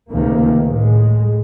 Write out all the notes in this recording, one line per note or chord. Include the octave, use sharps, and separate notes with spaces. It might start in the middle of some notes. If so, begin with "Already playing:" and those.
C#2 C3 D#3 A3 A#3
A2 G#3